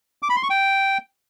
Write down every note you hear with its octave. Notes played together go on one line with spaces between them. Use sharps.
D6
B5
C6
C#6
G5